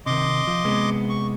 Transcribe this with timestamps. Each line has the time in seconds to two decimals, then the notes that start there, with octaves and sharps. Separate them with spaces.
0.06 C3 D#3 D#5 C6 D6
0.47 F3
0.65 C3 G#3 B3
1.10 C#6